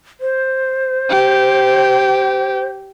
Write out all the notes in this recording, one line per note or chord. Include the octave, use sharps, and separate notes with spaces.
C5
G4